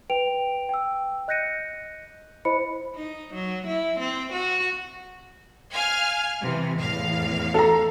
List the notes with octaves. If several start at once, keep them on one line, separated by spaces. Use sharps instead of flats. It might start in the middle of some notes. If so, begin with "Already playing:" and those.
B4 G5 D7 F7
G5 E6
D#5 F#6 G6 A#6 C#7 D#7
E4 C5 D#5 B5 C#7
D#4
F#3
E4
C4
F#4
F5 G#5 F6
C3 E3
E2 A2 F5
A4 A#5